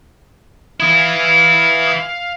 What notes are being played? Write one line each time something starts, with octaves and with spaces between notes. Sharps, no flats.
E3 E4 F5 D#6 G#6